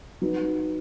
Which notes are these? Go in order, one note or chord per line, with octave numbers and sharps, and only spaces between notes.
F#3 D#4 B4